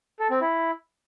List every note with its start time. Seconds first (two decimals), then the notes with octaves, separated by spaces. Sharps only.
0.20 A4
0.30 C4
0.41 E4